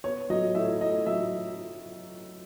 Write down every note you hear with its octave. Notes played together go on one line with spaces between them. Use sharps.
B3 C#5
F#3 D#5
A2 E5
A2 D#5
F#3 E5